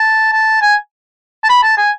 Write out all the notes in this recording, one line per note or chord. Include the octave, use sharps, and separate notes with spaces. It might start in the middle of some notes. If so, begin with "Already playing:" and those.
Already playing: A5
A5
G#5
A5
B5
A5
G#5